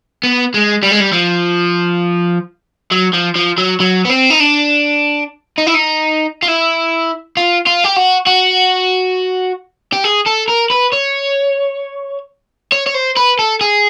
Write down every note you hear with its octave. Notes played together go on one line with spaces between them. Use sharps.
B3
G#3
G3
G#3
G3
F3
F#3
F3
F3
F#3
F#3
B3
C4
D#4
D4
D#4
E4
D#4
F4
E4
F4
F4
G4
F#4
F#4
G4
G#4
A4
A#4
B4
C#5
C#5
C#5
C5
B4
A4
G#4